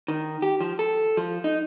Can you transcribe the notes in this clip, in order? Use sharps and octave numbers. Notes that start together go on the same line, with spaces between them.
D#3
G4
F3
A4
F3
D#4